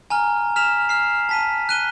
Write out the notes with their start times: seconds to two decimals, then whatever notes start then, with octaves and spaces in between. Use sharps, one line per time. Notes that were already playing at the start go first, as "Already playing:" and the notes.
0.10 G#5 A#5 F6
0.56 F6 B6 E7 F7
0.89 F6 C7
1.29 A5 B6 D#7
1.69 F#6 D#7 G7